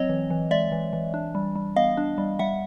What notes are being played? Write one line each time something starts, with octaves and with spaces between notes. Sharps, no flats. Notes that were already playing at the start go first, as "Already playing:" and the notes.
Already playing: F#3 C4 C#5 D#5
E3
E3
G#3 D5 E5
E3
E3
D4
G3
G3
B3 D#5 F5
D4
G3
G3 E5 F#5